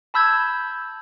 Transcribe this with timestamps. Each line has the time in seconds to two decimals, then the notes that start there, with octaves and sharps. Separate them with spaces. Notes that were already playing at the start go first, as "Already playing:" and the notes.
0.14 A5 B5 E6 G6 G#6